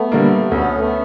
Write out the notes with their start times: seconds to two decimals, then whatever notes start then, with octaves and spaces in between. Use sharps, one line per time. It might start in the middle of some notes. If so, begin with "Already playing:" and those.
Already playing: A3 B3
0.12 D3 G3 A#3
0.51 D2 B3 C#4
0.79 A3 B3